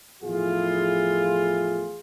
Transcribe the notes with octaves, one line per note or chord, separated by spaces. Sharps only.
E2 A2 F3 E4 F4 G#4